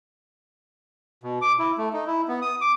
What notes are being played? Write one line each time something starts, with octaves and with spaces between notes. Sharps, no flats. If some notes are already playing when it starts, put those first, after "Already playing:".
B2
D6
E4
A3
D#4
E4
B3
D#6
D6